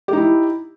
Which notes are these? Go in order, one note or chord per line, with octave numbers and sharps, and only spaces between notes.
D#4 E4 G4